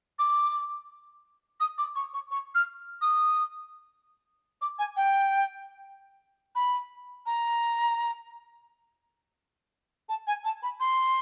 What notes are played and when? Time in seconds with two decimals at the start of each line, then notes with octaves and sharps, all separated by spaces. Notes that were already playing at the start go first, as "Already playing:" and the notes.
0.19 D6
1.60 D#6
1.78 D6
1.96 C#6
2.14 C#6
2.31 C#6
2.55 F6
3.01 D#6
4.62 D6
4.79 G#5
4.97 G5
6.55 B5
7.26 A#5
10.09 A5
10.27 G#5
10.45 A5
10.63 B5
10.80 C6